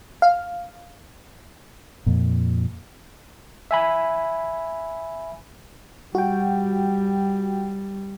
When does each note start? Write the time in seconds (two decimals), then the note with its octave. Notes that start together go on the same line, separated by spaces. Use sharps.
0.22 F5
2.06 F2 A#2
3.71 E5 G#5 B5
6.15 G3 F#4 G5